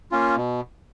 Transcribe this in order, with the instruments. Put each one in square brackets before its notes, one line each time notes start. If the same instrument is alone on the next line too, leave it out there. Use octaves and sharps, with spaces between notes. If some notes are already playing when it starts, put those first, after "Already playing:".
[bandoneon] A#3 C#4 F4
B2